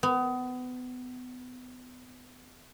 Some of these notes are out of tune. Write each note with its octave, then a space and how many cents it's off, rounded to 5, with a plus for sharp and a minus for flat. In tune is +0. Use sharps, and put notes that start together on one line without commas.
B3 +30